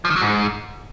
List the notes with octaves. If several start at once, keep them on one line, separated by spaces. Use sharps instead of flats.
F3
D#3
F#3
G#2